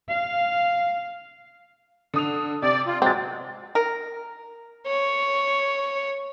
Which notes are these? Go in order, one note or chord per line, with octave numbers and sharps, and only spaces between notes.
F5
D3 D#6 F7
C3 D5
F4
F#3 G#3 C4 D6 A6
A#4
C#5